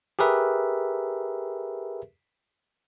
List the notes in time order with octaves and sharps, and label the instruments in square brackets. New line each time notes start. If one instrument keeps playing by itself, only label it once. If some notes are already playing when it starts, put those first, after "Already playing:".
[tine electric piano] G4 G#4 A#4 B4 E5